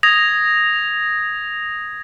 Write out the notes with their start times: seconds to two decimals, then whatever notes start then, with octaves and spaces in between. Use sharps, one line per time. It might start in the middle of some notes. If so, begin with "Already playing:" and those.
0.03 D#6 G#6 A#6 F7